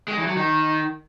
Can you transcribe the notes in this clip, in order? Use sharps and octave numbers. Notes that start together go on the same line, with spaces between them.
G#3
E3
F#3
D#3